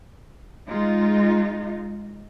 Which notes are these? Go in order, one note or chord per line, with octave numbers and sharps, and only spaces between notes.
G#3 D#4 F4